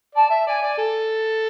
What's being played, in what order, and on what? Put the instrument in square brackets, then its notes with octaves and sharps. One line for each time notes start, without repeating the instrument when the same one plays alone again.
[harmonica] D5 [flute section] A5
[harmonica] E5
[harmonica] D5 [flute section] G#5
[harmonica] D5
A4